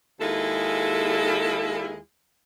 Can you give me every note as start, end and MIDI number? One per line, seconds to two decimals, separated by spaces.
0.20 1.98 39
0.20 1.98 56
0.20 1.98 64
0.20 1.98 65
0.20 1.98 68
0.20 1.98 69